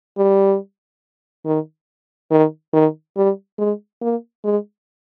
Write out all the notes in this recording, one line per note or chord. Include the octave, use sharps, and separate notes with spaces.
G3
D#3
D#3
D#3
G3
G#3
A#3
G#3